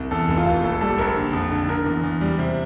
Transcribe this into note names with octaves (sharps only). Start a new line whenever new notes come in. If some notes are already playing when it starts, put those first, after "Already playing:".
Already playing: C2
E2 A4
F1
F4
F1
A#1 A4
G3 A4
A#1 A#4
D3
F2
D3
D3 A#4
E2
E2
G3
C3